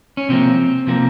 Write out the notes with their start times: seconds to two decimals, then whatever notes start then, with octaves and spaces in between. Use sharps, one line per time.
0.17 C#4
0.29 C3 F3 A#3 C4
0.87 C3 F3 A#3